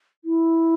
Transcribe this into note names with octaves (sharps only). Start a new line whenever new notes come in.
E4